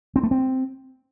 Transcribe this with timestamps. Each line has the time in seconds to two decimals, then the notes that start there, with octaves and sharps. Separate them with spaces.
0.16 C4
0.23 A3
0.31 C4